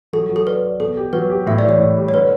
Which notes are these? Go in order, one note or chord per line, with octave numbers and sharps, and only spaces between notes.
F#3 A4
F#3
A4
B4 D5
D5
B2 A4
G4
F#3 B4
G4
A2 E5
D5
E3
C#5
A2
G3
C#5
D3 B4